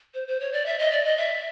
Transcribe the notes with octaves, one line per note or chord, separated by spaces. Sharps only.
C5
C5
C#5
D5
E5
D#5
D5
D#5
E5